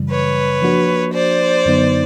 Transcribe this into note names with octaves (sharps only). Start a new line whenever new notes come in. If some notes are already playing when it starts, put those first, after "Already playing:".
Already playing: F#2 C#3 E3 G3
B4 C#5
F3 A#3 D4 F#4
C5 D5
F#2 D3 F#3 B3 D#4